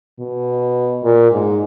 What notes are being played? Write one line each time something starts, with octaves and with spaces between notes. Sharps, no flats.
B2
A#2
G#2